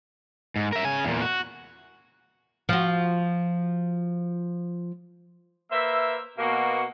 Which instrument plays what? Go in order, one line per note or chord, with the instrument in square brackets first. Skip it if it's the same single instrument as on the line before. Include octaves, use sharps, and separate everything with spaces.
[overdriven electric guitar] G#2
A#4 E5
C#3 G#5
E2 A#2
F#4
[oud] F3 F#4
[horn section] A#3 B4 C5 E5
B2 A#3 F#4